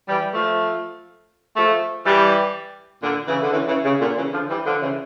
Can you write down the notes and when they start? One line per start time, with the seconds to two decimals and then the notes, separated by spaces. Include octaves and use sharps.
0.09 E3 G3
0.34 F3 A3
1.57 F3 A3
2.05 E3 G3
3.03 A#2 D3
3.28 C#3 E3
3.42 D3
3.51 C#3 E3
3.68 C#3 E3
3.84 C#3
4.00 A#2 D3
4.17 C#3 E3
4.33 D3 F3
4.50 E3 G3
4.66 D3 F3
4.82 C#3 E3